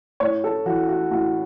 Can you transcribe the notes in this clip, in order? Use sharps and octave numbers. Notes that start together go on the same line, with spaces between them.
A2 C#5
A4
E3 F#4
F#4
A2 F#4